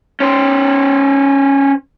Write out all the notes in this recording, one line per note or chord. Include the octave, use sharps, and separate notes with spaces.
C#4 C5